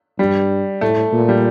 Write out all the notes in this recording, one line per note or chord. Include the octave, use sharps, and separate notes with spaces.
G2 G3
A2 A3
A#2
G3